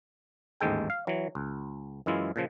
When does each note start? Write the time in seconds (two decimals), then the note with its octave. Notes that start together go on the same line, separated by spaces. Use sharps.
0.61 A1 D#2 G#2 G#3 A4 G5
0.90 F5
1.07 E3 F#3
1.35 C#2
2.06 F#2 E3 G#3 E4 F4
2.36 A#2 C#3 F3